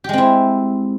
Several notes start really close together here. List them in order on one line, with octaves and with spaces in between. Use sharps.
G4 G#3 C4 E4